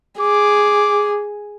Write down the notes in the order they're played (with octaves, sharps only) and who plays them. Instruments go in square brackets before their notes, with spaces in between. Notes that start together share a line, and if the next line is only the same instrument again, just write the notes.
[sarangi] G#4 [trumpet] D6